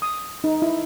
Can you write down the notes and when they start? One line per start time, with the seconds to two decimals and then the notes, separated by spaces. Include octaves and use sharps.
0.02 D#6
0.44 D#4
0.62 E4